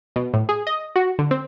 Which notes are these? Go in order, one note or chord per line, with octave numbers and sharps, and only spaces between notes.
B2
A2
G#4
D#5
F#4
D3
C4